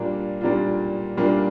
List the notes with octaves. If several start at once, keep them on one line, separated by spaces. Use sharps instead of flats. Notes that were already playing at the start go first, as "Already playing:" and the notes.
Already playing: A#2 G3 A#3 D4 F4
A#2 G3 A#3 D4 F4
A#2 G3 A#3 D4 F4